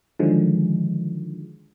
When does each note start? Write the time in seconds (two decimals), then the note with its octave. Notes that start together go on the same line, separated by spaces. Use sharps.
0.19 D3 D#3 F3 F#3 G#3